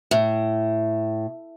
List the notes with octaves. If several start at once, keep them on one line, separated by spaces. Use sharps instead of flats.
A2